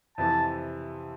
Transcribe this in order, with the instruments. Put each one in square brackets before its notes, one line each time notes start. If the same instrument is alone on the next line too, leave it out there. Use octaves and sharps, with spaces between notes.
[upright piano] F2 C3 E3 [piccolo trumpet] A5